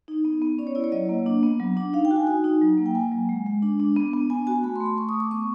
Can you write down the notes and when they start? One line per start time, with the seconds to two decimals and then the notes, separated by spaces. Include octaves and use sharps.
0.08 D#4
0.25 B3
0.42 B3
0.58 C#4 D5
0.67 C#5
0.75 E4 D5
0.84 C#5
0.92 F#3 D#5
1.09 A#3
1.26 D4
1.43 B3
1.60 F#3
1.77 D4
1.93 D#4 F5
2.05 G5
2.11 F#4
2.16 G#5
2.27 D#4 G#5
2.44 D#4
2.62 F#3
2.78 A#3
2.86 G5
2.95 A#3 G#5
3.12 F#3
3.29 G#3
3.46 G#3
3.63 D4
3.80 D4
3.96 B3
4.13 B3
4.30 B3 G#5
4.47 F#4 G#5
4.64 A3 B5
4.76 C6
4.80 A3
4.86 C6
4.97 A3 C#6
5.09 D#6
5.15 A3
5.20 D6
5.31 B3 C#6